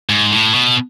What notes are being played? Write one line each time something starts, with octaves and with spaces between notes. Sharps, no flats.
G#2
A2
B2